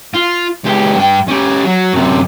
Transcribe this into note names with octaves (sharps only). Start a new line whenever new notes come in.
F4
C#2 G4
G2 G5
C#4 G4
F#3
F#2 C3